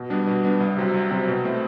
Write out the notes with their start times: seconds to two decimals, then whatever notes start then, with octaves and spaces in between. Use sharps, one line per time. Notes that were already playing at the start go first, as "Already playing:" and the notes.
Already playing: B2
0.10 G3 B3 D4
0.27 B2
0.44 G3 B3 D4
0.60 C2
0.76 C3 F#3 C4
0.94 C2
1.10 C3 F#3 C4
1.28 B2
1.44 A3 C4 E4